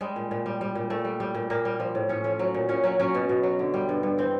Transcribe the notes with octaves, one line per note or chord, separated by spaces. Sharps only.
G3 G#3
A#2
A#2
G3
G3
A#2
A#2 A3
G3
G3
A#2
A#2 A#3
G3
F3
A2
A2 C#4
F3 C#4
F#3
A#2
A#2 C#4
F#3 C#4
F#3 C#4
B2
B2
F#3
D3
G3
G2
G2
E3 C4